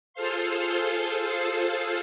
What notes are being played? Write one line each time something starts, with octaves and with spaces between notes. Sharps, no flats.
F4 G#4 A4 C5 F5 C6